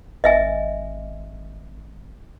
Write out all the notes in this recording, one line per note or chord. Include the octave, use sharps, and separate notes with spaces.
G#1 D#5 E5 G#5